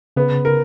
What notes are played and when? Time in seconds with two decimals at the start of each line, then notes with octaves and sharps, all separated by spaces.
0.16 C#3 B3
0.45 A#4